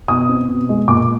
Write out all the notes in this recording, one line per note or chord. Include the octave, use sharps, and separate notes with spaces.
B2 D#6
C4
B2
G#3
A#2 D6